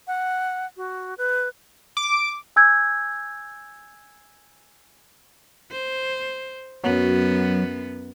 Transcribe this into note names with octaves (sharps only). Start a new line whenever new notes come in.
F#5
F#4
B4
D6
G#5 E6 G6 G#6
C5
F#2 F#3 B3